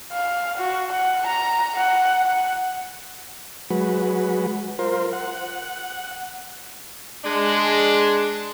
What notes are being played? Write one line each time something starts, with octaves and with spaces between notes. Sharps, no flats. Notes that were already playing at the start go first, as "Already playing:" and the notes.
F5
F#4
F#5
A#5
F#5
F#5
F#3 G#3 F#4 B4
F4 A#4 C5
F#5
G#3 D4